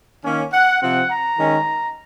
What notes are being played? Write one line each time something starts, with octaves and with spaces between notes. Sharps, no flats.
D#3 A#3 C#4
F#5
C3 F3 C4 F#5
A#5
D#3 G#3 C#4